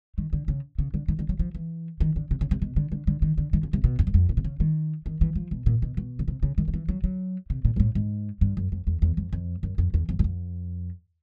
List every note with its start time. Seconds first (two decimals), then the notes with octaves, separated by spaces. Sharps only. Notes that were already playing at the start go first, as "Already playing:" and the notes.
0.18 D#3
0.33 D3
0.48 C#3
0.79 C#3
0.94 D3
1.08 D#3
1.19 D3
1.29 F#3
1.39 F3
1.55 E3
2.00 D#3
2.16 D3
2.31 C3
2.41 C#3
2.51 C3
2.62 B2
2.76 D3
2.92 D3
3.07 D3
3.22 D#3
3.38 D3
3.53 D#3
3.63 C#3
3.73 C3
3.84 B2
3.99 F2
4.07 F#2
4.14 F2
4.29 B2
4.37 C3
4.44 C#3
4.60 D#3
5.06 D#3
5.21 E3
5.35 F3
5.51 B2
5.66 A#2
5.82 B2
5.97 B2
6.19 C#3
6.28 C3
6.43 C#3
6.58 D#3
6.68 D#3
6.74 E3
6.89 F#3
7.04 F#3
7.50 C3
7.65 A#2
7.76 A#2
7.80 A2
7.95 G#2
8.41 G2
8.57 F#2
8.72 F2
8.87 E2
9.02 E2
9.17 F2
9.33 F2
9.63 F#2
9.78 F2
9.94 E2
10.09 F2
10.19 F#2
10.24 F2